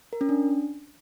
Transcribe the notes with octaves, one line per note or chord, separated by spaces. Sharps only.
A#4
C#4
D4